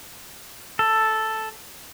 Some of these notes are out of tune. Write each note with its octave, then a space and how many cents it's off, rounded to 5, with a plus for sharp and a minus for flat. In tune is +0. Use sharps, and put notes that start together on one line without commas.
A4 +0